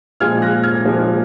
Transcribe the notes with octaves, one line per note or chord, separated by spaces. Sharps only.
A#2 F3 G#3 F6 G#6
F#6 A#6
F6 G#6
A#2 F3 G#3